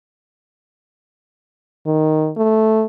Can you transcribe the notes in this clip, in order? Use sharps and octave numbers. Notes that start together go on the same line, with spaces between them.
D#3
A3